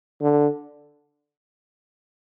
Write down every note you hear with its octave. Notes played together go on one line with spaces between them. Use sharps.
D3